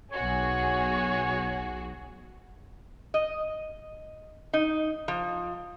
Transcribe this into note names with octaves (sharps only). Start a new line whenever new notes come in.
B1 F#4 G#4 C#5
D#5
D#4
F3